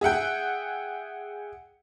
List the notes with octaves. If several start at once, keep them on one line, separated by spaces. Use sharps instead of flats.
G#4 E5 F#5 G5